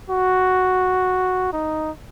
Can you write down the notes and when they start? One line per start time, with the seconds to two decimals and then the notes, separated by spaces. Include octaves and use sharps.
0.10 F#4
1.53 D#4